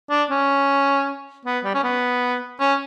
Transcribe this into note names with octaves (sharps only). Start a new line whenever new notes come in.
D4
C#4
B3
G3
C#4
B3
C#4